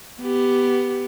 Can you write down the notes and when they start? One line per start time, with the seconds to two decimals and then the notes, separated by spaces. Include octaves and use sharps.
0.21 B3 G4